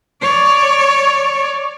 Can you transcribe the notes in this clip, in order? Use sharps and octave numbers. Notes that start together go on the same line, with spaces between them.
C#5 D5